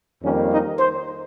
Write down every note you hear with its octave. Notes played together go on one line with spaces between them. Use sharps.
F2 D#3 G3 A#3 C#4
D#4
C5